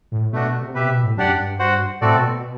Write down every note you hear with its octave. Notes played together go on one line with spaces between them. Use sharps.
A2
B2 A3 D4 F#4
B2
C3
B2 G4 B4 E5
C3
B2
A2
F#2 D4 G4 D5 F#5
G2
F#4 C5 F#5
A2 A3 C4 F#4 A4 D5
B2
B2